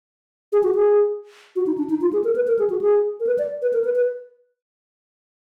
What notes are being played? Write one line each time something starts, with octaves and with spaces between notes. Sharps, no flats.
G#4
F#4
G#4
F#4
D#4
D4
D#4
F4
G#4
A#4
B4
A#4
G#4
F#4
G#4
A#4
B4
D5
B4
A#4
B4
B4